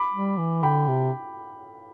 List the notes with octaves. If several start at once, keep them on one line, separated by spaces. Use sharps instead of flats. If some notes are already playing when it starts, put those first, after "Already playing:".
Already playing: B5 D6
G3
E3
D3 G5 B5
C3